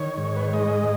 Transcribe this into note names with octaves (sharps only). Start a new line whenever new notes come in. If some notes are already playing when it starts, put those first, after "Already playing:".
Already playing: D#3 C#5
G#2
B4
C#5
G#3 D#5